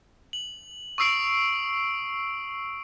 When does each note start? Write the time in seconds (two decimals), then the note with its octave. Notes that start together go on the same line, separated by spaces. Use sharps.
0.33 F#7
0.98 C#6 D#6 E6 C7 D7